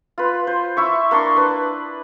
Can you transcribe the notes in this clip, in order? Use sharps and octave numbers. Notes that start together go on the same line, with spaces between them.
F4 B4
C5
E4 E5 C#6
A#3 D4 C6 C#6
D4 B4